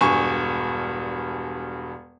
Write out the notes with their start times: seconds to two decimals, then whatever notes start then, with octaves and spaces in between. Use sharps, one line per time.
0.01 E1 G2 G#5 C#6